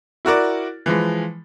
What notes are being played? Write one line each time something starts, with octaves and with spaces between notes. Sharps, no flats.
E4 F#4 A#4 D5
E3 F3 G#3